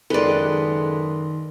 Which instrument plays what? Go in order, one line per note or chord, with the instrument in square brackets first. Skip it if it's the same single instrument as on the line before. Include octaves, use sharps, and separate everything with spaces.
[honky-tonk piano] F#1 G#3 [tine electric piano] D#3 C6 [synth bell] A4 [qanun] B4 D5